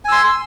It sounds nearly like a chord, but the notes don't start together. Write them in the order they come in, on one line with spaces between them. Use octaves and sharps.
G#5 E6 C6